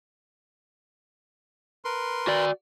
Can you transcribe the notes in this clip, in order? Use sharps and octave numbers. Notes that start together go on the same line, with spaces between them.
A#4 B4 C6
F#4 D5